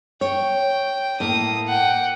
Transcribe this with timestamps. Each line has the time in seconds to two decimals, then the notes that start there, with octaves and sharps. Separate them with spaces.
0.21 C#5 G5
1.20 A2 A#3 D#6
1.68 F#5 G5